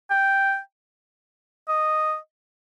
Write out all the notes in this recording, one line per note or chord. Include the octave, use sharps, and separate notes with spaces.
G5
D#5